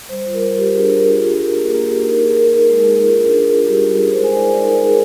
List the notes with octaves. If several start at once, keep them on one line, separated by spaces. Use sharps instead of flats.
G3 C5
F4
A#4
G3
F4 G4
A#4
D4 G#4
D4 A#4
F4 G#4
F4 G4
F4 A#4
A#3 G#4
A#3 G#4
A#3 G4
D#4 A#4
D#4 G#4
D#4 A#4
D#4 A#4
G#3 A#4
D#4 G#4
A#4
F4 G#4
D4 G#4
D4 G#4
F4 G#4
G3 G4
F4
A#4
D#4 G#4
C5
G#3
G#5
D#4 C5 D5
D#4 D5
D#4 A#4
D#4 G#4